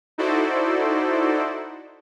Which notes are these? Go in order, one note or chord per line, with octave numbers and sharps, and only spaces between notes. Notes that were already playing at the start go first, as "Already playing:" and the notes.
D#4 E4 F#4 A4 C5 D5